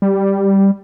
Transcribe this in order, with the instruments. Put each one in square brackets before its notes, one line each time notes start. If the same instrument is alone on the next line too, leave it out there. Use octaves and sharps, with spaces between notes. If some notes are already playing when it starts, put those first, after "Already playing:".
[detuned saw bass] G3